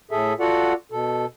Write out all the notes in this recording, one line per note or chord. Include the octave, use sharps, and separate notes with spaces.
A2 G#4 A4 E5
F4 F#4 A4 D5 F#5
B2 A4